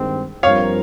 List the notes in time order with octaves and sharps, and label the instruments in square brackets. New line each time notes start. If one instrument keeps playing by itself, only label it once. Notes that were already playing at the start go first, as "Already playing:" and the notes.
Already playing: [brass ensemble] G2 D#3 G#3 C4
[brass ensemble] G2 F3 C4 F4 A#4 [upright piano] C#5 F5